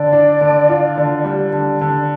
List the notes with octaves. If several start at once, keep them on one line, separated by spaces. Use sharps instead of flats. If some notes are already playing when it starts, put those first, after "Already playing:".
Already playing: D3 D5
D4
D3
F4
D3
G3
D3
D3